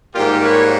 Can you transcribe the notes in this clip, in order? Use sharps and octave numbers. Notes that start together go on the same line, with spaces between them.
G#2 D#3 G3 A#3 F4 G4
B4 C#5